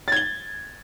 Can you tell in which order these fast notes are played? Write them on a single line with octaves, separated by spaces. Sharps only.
A6 G#6 G7